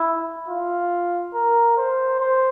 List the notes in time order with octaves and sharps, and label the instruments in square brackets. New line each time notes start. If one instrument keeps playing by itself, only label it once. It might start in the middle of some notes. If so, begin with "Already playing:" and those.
Already playing: [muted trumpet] E4
F4
A#4
C5
C5